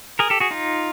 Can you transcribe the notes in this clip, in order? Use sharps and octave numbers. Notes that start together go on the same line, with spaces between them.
G#4 A#4
G4 A4
F#4 G#4
D#4 F4